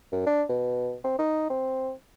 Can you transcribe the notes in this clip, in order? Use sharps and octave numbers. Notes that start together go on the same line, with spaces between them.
F#2
D4
B2
C4
D#4
C4